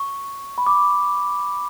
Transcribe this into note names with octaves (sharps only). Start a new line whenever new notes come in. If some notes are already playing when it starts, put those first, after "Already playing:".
Already playing: C#6
B5
D6